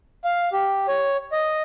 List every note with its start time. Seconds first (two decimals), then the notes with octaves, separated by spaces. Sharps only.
0.24 F5
0.53 G4
0.88 C#5
1.32 D#5